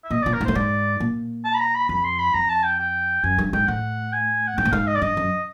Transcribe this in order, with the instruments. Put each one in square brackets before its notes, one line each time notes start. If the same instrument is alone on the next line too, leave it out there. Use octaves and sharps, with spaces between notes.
[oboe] E5
[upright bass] A#2 [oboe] D#5
[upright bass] A#2 [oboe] D5
[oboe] A#4
[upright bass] G#2
[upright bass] A2 [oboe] C5
[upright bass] G#2 [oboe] D5
[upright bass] A#2
[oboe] A5
B5
A#5
B5
[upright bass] F2 [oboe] B5
[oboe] C6
B5
[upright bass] F2 [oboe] A#5
[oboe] A5
G5
G5
[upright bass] F#2 [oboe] G#5
[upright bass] G2
[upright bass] G#2 [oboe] G5
[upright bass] A2 [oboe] F#5
[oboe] G#5
F#5
[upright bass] G#2 [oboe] G5
[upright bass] A2
[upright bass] G#2 [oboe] F5
[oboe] D#5
D5
[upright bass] G2 [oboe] D#5
[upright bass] F#2